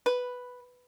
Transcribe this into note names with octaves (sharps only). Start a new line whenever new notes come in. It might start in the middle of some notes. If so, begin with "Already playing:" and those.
B4